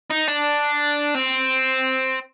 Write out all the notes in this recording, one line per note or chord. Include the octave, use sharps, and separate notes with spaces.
D#4
D4
C4